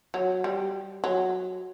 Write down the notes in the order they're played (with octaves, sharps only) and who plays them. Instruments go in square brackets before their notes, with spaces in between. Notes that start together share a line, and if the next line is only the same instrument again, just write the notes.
[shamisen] F#3
G3
F#3